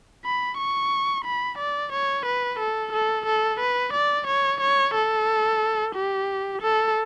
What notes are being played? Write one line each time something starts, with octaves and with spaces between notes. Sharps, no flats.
B5
C#6
B5
D5
C#5
B4
A4
A4
A4
B4
D5
C#5
C#5
A4
G4
A4